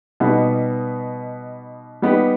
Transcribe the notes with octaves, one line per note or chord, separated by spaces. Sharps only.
B2 G3 B3 D#4
G3 B3 D#4 G4